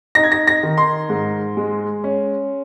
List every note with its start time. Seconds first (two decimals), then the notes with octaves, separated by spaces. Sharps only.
0.15 D#4 A#6
0.24 G#6
0.32 A#6
0.47 A#6
0.63 D#3
0.78 C6
1.09 G#2
1.57 G#3
2.04 C#4